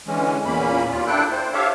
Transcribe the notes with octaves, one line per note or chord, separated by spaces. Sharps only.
D3 E3 G#3 C#4
E2 A#2 A#3 C#4 B5
D#2 F4
D4 E4 A4 G5 F#6
C5
G4 A4 C#5 E5 F5